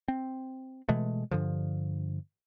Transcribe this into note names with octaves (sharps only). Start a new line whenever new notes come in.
C4
B2 E3 G#3 A3
G2 D3 F3